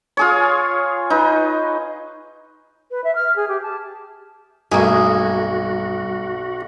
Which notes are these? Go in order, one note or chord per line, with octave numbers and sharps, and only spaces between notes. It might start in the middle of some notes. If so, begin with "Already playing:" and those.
F4 G#4 C#5
D#4 B4
B4
E5
F6
G#4
G4
A5
B1 G2 A3 A#3 F#4 G#4